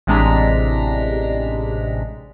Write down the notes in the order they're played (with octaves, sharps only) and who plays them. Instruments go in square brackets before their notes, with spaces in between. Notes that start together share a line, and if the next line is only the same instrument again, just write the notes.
[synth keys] A1 C3 G#3 D4 A#5 B6